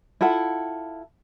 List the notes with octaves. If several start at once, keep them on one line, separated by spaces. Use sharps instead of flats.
E4 F4 A4 F#5